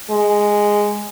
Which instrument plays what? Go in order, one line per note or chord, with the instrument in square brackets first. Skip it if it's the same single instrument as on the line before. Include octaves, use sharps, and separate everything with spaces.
[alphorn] G#3